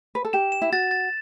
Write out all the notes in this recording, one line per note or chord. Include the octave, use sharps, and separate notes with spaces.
B4
A4
G4 E7
E7
E4
F#4 A6
A6